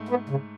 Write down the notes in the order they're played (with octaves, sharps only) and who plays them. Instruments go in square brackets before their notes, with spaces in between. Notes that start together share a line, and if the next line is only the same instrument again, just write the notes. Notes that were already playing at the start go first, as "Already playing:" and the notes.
Already playing: [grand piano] G#2 A3
[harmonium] B3
C#3